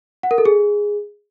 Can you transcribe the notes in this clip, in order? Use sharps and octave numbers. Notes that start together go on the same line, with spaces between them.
F#5
A#4
A4
G#4